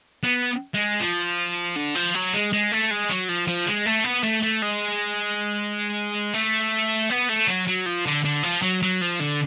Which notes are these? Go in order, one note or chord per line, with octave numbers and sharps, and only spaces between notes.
B3
G#3
F3
D3
F3
F#3
G#3
G#3
A3
G#3
F#3
F3
F3
G#3
A3
B3
A3
A3
G#3
A3
B3
A3
F#3
F#3
F3
D3
D3
F3
F#3
F#3
F3
D3